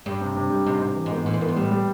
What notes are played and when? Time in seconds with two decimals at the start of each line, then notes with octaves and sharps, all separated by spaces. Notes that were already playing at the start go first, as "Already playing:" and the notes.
0.06 G2 G3
0.21 C3
0.36 C3
0.50 G3
0.66 G#2 C3
0.81 C3
0.96 E3
1.06 G#2
1.12 B3
1.26 A2 E3
1.34 G#2
1.41 G2 B3
1.49 G#2
1.56 A2 G3
1.71 G3